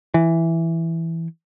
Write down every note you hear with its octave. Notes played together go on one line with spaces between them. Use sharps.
E3